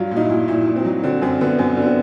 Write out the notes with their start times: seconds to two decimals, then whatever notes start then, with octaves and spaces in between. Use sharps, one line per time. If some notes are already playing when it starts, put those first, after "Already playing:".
Already playing: G2 F#3 F4
0.11 A#2
0.16 D#4
0.20 E4
0.30 A#2
0.48 A#2 E4
0.67 A#2
0.76 C4
0.85 F#3
1.04 D3 C4
1.22 F#2 C4
1.41 D3 B3
1.58 F#2 C4
1.77 D3 B3
1.86 C4